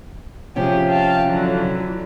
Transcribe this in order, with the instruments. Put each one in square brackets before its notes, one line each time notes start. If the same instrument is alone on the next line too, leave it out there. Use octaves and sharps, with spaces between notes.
[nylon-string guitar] C3 F3 [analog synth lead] C#4 [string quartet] G4 G#4
[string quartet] F5 G5 A5
D3 E3 F#3